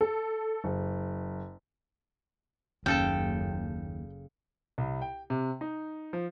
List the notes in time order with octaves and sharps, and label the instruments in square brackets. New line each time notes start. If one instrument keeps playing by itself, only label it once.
[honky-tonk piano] A4
F#1
[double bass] F#1 [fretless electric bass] D#2 [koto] C#3 A4 A5 [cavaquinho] G5
[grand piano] C2
G5
C3
D#4
F3